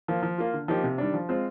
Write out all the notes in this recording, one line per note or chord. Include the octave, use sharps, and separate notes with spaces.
F3 A#3
F3
A#3 F4
D3
F3 A#3 D#4 G4
C3
D#3 G3 D4
F3
G#3 C4 F4 C5